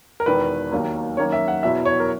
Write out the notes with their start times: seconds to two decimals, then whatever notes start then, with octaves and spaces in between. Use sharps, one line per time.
0.20 A#4
0.26 E1 E2 D#3 B4
0.71 D#2 D#3 F#3 A#3
1.17 F#2 D#3 A#3 C#4 C#5
1.32 E5
1.48 F#5
1.63 E2 B2 F#3 B3 E4 E5
1.85 C#5
2.00 A#4